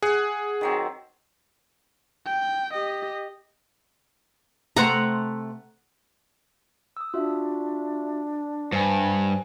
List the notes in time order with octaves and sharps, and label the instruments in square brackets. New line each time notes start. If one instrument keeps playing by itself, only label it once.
[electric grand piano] G#4 [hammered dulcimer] F#5
[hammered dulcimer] D#3 F#3 C4
[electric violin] G5
G4 D#5
[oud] C3 A3 C5 [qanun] F#5 A#5
[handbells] D#6 E6
[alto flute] D4 [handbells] F4 F#4 E5
[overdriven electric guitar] G2 [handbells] C5 G#5